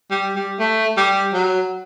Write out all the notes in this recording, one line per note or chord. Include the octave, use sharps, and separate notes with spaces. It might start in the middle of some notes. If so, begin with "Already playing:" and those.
G3
G3
A3
G3
F#3